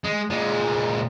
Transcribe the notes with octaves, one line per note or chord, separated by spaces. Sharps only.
G#3
A#2 G#3